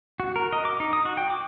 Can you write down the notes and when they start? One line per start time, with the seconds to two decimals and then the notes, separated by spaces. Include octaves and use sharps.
0.20 F#4
0.36 A#4
0.53 D#5
0.65 D6
0.80 D#4
0.93 D#6
1.05 F#4
1.17 G5
1.30 D6